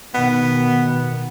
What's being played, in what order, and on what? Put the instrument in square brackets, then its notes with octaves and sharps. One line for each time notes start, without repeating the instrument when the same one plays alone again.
[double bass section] B2 D#3 [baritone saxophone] B3